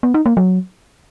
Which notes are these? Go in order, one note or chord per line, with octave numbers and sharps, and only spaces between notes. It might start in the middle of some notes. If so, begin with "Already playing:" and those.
B3
D#4
A#3
F#3